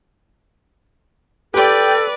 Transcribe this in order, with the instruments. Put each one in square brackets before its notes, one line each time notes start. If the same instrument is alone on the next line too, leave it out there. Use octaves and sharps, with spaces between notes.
[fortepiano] G4 [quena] A4 [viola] B4 D5 [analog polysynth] G5